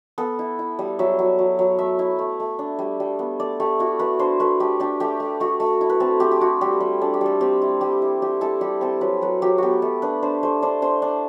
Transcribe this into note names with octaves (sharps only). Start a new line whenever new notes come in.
B3 A4
E4
E4
G3
F#3 E5
F#3
F#3
F#3
A3 E5
E4
A3
A3
D4
G3
G3
B3
A3 D5
A3 G4
E4 F#4
A3 B4
D4 C5
A3 B4
A3 G4
D4 G4
A3 G4
A3
A3 F#4
A3
E4
B4
C4 A4
C4 G4
G4
E4 F#4
G3 G4
G3
D4 A4
G4
G3 A4
C4 G4
E4
G3 G4
E4
G3 G4
E4 A4
G3 G4
C4 A4
F#3 B4
F#3 B4
F#3 G4
B3 F#4 G4
A3 A4
D4 B4
D4 C5
A3 C5
D4 C5
D4 C5
D4